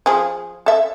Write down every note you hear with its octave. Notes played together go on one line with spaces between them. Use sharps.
F3 G#4
A4 E5